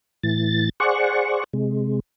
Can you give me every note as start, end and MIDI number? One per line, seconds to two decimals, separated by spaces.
0.23 0.69 45
0.23 0.69 52
0.23 0.69 93
0.80 1.44 68
0.80 1.44 72
0.80 1.44 74
0.80 1.44 78
0.80 1.44 85
1.53 2.00 48
1.53 2.00 56